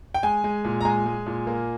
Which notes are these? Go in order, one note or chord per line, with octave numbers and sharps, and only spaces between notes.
G5
G#3 G#5
G#3
A#2
A#5
G#3 G#5
G#3
A#2
A#3